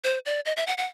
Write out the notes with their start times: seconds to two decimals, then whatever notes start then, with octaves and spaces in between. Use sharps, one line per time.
0.04 C5
0.26 D5
0.45 D#5
0.57 E5
0.67 F#5
0.78 F#5